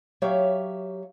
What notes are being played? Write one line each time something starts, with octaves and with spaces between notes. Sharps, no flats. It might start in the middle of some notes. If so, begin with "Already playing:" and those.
F#3 G4 C#5 E5 F5